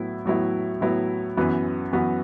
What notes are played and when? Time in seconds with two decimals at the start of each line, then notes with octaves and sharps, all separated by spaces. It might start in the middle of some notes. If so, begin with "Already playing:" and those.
Already playing: A2 F#3 B3 E4
0.25 A2 F#3 B3 E4
0.81 A2 F#3 B3 E4
1.37 F#2 E3 B3 F#4 B4
1.93 F#2 E3 B3 F#4 B4